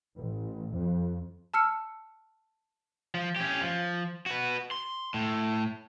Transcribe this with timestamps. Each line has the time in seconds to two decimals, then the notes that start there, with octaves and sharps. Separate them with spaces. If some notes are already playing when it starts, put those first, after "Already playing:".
0.16 A1
0.74 F2
1.54 A5 E6 F6 C#7
3.14 F3
3.36 C#4 G4
3.62 F3
4.26 F#4 B4
4.71 C6
5.14 A2